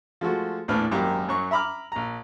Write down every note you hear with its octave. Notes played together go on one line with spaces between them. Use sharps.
F3 G#3 A3 F#4
A#1 E2 A2 D4 B4 F6
G#1 F#2 A#3 G4 D6
F#2 F#3 C#6
E5 A#5 B5 D6 F6
A#1 A#5